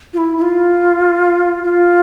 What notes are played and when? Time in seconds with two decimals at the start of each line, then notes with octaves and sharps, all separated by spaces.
0.13 F4
0.18 E4
0.37 E4
0.42 F4
1.63 F4